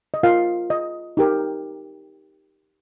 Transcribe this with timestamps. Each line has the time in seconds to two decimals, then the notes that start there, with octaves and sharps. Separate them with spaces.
0.14 D#5
0.23 F4 A#4 F5
0.70 D#5
1.17 D#4 G4 A#4